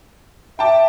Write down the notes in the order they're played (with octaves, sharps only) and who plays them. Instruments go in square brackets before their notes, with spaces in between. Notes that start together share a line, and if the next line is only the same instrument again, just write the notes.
[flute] E5 [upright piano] G5 A5 D6